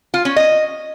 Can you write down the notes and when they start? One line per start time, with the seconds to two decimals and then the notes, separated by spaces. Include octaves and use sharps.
0.14 F4
0.25 C#4
0.36 D#5